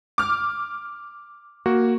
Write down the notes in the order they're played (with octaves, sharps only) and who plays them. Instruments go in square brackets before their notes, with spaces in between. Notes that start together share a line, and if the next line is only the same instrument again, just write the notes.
[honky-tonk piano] D6 F6
[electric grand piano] A#3 F#4